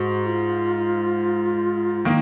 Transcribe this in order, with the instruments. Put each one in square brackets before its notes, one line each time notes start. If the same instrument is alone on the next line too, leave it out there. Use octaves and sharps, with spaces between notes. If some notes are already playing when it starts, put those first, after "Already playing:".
Already playing: [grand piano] G#2 [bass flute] F#4
[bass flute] F4
[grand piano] D#3 A#3 [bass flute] D#4